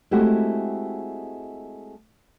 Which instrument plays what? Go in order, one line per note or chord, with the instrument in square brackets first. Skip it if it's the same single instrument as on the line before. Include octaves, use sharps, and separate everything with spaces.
[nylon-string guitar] G#3 A3 C4 E4 F#4 G4